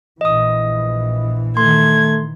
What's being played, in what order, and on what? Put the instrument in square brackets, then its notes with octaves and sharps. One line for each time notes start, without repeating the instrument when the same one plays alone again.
[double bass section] A#1 E3 [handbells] D#5 D#6
[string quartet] D#3 G#6 [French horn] A3 [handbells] C6